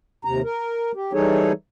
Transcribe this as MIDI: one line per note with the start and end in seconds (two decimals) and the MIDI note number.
0.25 0.41 39
0.25 0.41 48
0.25 0.41 82
0.44 0.92 70
0.95 1.13 67
1.13 1.52 52
1.13 1.52 55
1.13 1.52 63
1.13 1.52 68
1.13 1.52 69
1.13 1.52 73